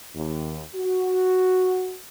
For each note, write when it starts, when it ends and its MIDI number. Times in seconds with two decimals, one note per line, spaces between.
0.16 0.61 39
0.76 1.94 66